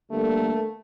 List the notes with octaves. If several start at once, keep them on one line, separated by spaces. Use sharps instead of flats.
D3 G3 A3 A#3